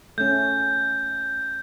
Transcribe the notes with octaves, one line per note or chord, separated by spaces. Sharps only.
A3 C#4 G6